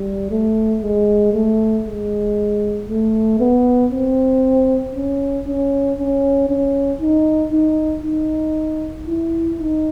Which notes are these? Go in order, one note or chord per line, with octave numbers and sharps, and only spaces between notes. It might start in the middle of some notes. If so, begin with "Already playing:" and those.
Already playing: G3
A3
G#3
A3
G#3
A3
B3
C4
C#4
C#4
C#4
C#4
D#4
D#4
D#4
E4
D#4